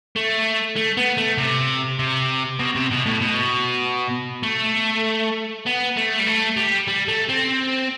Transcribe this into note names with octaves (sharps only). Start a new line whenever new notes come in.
A3
A3
B3
A3
C3
C3
B2
C3
B2
A2
B2
A3
B3
A3
G3
A3
G3
G3
A3
C4